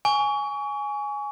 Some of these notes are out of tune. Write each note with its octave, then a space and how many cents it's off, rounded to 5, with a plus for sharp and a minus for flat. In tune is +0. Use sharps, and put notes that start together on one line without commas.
G#5 +0 C#6 +30